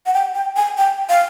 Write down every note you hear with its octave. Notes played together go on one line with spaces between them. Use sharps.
F#5
G5
G5
G#5
G5
F5